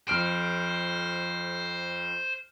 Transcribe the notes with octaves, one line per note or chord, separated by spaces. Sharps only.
F2 C5 F6 D7